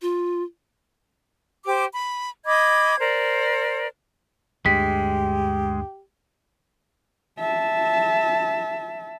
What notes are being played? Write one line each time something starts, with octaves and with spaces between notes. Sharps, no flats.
F4
G4 C5 D6
B5
D#5 B5 D6 G#6
A#4 C5 D5
D2 G2 G#3 G4 B6
E5 A5